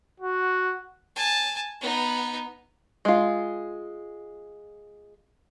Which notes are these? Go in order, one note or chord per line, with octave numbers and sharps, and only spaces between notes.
F#4
G#5 A5
B3 D#4
G#3 F4